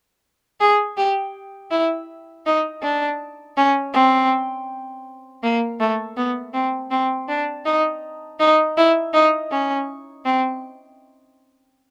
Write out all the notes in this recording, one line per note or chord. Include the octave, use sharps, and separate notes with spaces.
G#4
G4
E4
D#4
D4
C#4
C4
A#3
A3
B3
C4
C4
D4
D#4
D#4
E4
D#4
C#4
C4